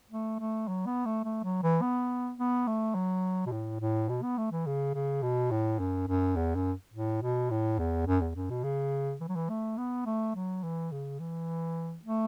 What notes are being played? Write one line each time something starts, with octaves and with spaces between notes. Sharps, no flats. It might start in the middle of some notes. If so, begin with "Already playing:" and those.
A3
A3
F#3
B3
A3
A3
F#3
E3
B3
B3
A3
F#3
B2
A2
A2
B2
B3
A3
E3
C#3
C#3
B2
A2
F#2
F#2
E2
F#2
A2
B2
A2
E2
F#2
E2
F#2
B2
C#3
E3
F#3
E3
A3
B3
A3
F#3
E3
C#3
E3
A3